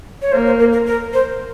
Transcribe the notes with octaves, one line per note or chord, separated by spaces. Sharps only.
C#5
A#3 C5
C5
A#4
A#4
A#4
C5